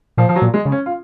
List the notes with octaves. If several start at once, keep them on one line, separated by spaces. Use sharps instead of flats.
A#2 F3
F3
F#3
A#2
G#3
C#3
C#4
F4